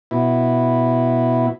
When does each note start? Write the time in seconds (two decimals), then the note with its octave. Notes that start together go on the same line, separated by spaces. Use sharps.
0.11 B2 E4